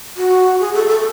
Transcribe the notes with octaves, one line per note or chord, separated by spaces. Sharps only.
F#4
G#4
A4
A4